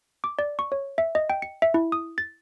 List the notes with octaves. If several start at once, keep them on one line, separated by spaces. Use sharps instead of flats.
D6
D5
C#6
C#5
E5
D#5
G5
C#7
E5
E4
D#6
A6